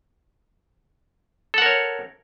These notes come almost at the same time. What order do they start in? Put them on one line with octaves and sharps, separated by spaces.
A4 F#5 A#4 C#5